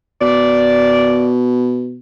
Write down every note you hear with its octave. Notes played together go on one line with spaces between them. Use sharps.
B2 D5